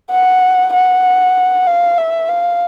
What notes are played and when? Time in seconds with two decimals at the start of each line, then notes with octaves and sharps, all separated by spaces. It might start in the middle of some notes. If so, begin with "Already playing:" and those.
0.10 F#5
0.73 F#5
1.67 F5
1.98 E5
2.28 F5